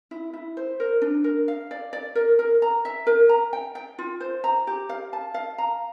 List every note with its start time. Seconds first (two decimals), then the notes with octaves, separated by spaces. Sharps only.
0.11 E4
0.33 E4
0.57 C5
0.80 A#4
1.02 D4
1.24 A#4
1.48 F5
1.71 D5
1.93 D5
2.15 A#4
2.39 A#4
2.62 A#5
2.85 E5
3.07 A#4
3.29 A#5
3.53 G5
3.75 G5
3.99 F4
4.21 C5
4.44 A#5
4.67 G4
4.89 F5
5.13 A5
5.34 F5
5.58 A#5